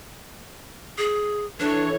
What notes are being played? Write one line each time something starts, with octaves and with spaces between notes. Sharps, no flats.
G#4
E3 D4 A4 C#5